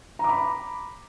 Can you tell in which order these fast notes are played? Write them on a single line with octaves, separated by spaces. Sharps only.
A#5 D6 B5